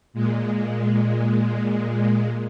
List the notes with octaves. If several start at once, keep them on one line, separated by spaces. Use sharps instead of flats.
A#2 G#3